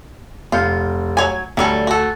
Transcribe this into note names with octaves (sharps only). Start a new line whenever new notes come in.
F1 F4 G6 C#7
F#3 C#5 G#5
D2 F#3 G3 A4 G#5
F#4 A4